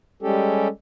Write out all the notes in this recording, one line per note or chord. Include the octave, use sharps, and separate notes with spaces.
G3 G#3 C#4 G4 A4